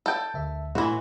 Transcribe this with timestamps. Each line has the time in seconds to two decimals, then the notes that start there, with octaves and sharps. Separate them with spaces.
0.06 A4 G5
0.34 D2 E5
0.75 A2 E3 E4 F#4 C6